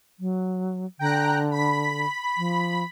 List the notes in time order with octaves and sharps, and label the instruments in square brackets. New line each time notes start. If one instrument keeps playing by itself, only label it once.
[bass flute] F#3
[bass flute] D3 [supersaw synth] G5 A#5 F#6
[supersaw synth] B5 B6
[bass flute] F3